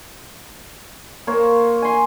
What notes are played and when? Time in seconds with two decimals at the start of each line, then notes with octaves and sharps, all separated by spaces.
1.27 A#3 C5 C#5
1.82 G#5 C6